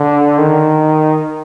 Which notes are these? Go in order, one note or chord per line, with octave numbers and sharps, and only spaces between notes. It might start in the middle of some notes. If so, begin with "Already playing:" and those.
Already playing: D3
D#3